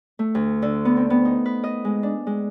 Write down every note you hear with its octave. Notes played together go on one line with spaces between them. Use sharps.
A3
D2
D3
B3
C4
B3
D#4
B4
D#5
G#3
D4
G#3